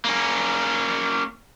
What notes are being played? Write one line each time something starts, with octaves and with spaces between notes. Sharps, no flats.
A#3 C#4